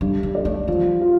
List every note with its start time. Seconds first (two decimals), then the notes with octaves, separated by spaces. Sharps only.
0.01 G2 G3
0.23 G3
0.35 D5
0.45 A3
0.68 F3 G3
1.01 F4